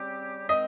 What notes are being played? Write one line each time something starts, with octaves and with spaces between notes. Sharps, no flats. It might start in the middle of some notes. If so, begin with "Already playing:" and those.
Already playing: C#3 G3 C4 G4
D#3 G#3 C4 D#5